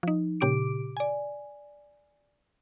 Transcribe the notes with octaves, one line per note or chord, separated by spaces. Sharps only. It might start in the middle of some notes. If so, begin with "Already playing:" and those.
F3 D#4
A#2 C#3 G4 D6 D7
D5 G#5